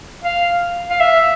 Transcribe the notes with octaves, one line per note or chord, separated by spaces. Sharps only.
F5
F5
E5